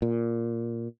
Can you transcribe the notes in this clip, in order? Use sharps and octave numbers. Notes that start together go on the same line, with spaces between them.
A#2